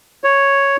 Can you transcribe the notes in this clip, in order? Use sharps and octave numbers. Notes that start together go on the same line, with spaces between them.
C#5